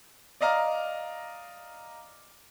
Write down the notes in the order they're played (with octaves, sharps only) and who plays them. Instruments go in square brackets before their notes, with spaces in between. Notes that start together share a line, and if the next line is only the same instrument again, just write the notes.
[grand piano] D5 D#5 F5 A#5 F6